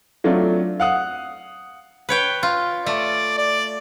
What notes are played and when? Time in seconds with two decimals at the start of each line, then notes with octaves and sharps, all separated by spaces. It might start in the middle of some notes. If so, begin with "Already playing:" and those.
0.24 F#3 A3 C4 D4 F4
0.80 F5 F#5 D#6
2.09 B4 C#5 G5
2.43 F4
2.86 A3 D5
3.38 D5